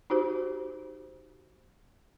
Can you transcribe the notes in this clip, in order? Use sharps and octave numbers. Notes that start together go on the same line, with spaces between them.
D#4 F#4 G4 C5